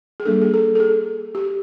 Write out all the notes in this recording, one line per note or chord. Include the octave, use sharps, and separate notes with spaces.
G#4
G3 A#3 D4 A4
G#4
A4
A4
G#4
G4